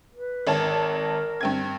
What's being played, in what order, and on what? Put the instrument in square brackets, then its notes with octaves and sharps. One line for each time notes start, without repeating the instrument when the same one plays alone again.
[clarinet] B4
[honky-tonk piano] G#1 C#5 A5 [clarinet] A#4
[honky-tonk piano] G2 C4 G#6